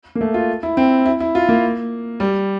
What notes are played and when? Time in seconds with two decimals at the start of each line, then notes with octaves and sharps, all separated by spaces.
0.15 A#3
0.21 A3
0.34 F4
0.63 E4
0.77 C4
1.06 E4
1.20 E4
1.35 F4
1.49 A#3
2.20 G3